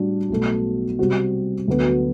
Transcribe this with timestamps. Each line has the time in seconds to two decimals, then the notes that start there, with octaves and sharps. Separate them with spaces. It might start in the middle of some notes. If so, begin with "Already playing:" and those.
Already playing: A2 G3 D4 F#4
0.30 B1 B2 A3
0.99 C3 G3 C4 F#4
1.68 D2 D3 F#3 B3